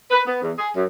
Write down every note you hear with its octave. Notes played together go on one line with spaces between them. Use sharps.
B4
B3
E2
G#4
F#2